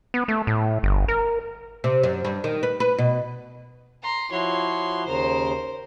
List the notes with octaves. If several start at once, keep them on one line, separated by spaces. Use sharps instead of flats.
B3
A3
A2
G1
A#4
C3
F#2
G2
D#3
B4
B4
B2
A#5 C6
F3 E4 F#4 C#5 C6
D#2 C#3 A#4 C5